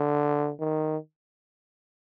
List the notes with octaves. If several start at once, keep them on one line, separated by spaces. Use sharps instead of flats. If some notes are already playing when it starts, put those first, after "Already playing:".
Already playing: D3
D#3